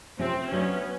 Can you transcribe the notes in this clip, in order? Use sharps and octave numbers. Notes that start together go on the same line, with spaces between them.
C3 F3 A3 C4 C#4
F#3 A3 B3 C#4 D4